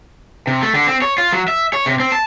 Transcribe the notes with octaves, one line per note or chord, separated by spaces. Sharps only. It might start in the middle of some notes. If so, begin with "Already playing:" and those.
C3
A3
D3
C4
C#5
F4
F#3
E5
C#5
C3
C4
A5